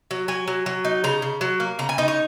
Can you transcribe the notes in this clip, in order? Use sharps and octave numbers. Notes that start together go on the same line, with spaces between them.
F#3
F#3 G#5
F#3
F#3
D#4
C#3 A#5
C#3
F#3
A#3
C#3 A#5
G#5
D#4 D#5
C#5